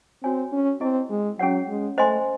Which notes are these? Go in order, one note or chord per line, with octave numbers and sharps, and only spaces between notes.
C4 F#4 C#5 G#5
C#4
C4 E4 G#4 D#5
G#3
F#3 C#4 G#4 C#5 F#5
G#3
A3 C5 D#5 G#5 C6